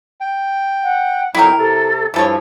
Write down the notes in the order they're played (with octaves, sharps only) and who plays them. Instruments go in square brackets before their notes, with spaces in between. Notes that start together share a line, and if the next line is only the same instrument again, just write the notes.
[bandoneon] G5
[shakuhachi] F#5
[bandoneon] F2 F#3 D#4 [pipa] E4 A#4 [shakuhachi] G5
[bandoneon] C3 [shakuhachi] A4
[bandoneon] G2 F3 [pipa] E3 A4 C#5 [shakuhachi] E4